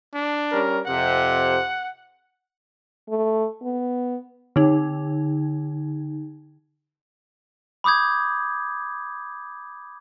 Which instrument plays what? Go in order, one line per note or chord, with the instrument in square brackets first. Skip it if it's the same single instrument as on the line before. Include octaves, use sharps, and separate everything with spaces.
[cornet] D4
[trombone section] G3 C#4 A#4
[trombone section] F2 C3 [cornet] F#5
[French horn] A3
B3
[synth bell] D3 D#4
[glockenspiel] B5 D6 D#6 G6 G#6